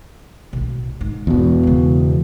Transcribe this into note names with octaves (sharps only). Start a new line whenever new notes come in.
B1 A2
G#2
E2 B2
C#3 G#3